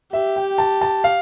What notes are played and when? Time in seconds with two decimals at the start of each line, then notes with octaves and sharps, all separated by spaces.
0.13 G4 E5
0.36 G5
0.58 A5
0.81 A5
1.04 F5